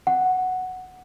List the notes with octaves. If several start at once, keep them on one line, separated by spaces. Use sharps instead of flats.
F#5